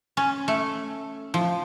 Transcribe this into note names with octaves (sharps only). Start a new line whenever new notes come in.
C#4
A3
F3